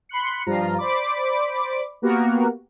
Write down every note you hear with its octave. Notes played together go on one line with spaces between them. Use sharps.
B5 C6 F#6 C#7
G2 F3 F4 A#5
C5 D5 B5 D6
A#3 B3 F#4 G4 A#4